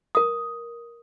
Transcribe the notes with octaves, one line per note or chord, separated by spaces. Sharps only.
A#4 D#6